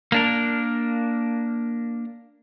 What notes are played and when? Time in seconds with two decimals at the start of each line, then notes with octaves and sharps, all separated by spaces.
0.12 A#3 D4 A#4